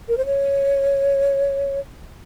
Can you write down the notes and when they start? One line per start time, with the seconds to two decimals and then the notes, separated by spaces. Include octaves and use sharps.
0.09 A#4
0.17 C5
0.26 C#5